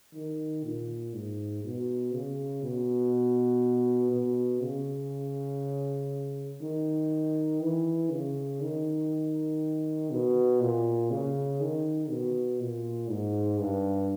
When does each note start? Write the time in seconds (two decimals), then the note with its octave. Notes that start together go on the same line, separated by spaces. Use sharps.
0.14 D#3
0.64 A#2
1.14 G#2
1.64 B2
2.14 C#3
2.63 B2
4.12 B2
4.62 C#3
6.62 D#3
7.62 E3
8.11 C#3
8.61 D#3
10.11 B2
10.60 A#2
11.11 C#3
11.60 D#3
12.10 B2
12.60 A#2
13.10 G#2
13.60 G2